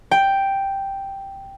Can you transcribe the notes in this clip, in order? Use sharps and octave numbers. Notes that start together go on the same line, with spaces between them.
G5